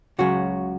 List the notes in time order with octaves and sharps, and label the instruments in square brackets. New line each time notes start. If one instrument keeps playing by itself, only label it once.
[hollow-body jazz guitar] C#2 C#3 F#3 F#4